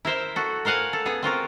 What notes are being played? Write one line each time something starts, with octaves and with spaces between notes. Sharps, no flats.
E4 A#4 C5 E5
F#4 A4
A#4 C5 F5 F#5 G#5
A4
B3 G#4
C4 F4 F#4 A#4